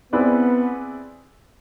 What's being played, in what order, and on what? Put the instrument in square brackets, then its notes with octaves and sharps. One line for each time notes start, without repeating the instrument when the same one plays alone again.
[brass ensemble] B3 [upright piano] C4 E4 G#4 B4 D5